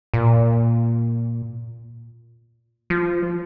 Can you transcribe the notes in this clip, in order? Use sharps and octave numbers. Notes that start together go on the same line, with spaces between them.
A#2
F3